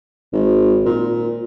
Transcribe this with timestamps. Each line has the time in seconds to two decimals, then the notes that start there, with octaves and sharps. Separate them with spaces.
0.33 G#1
0.85 A#2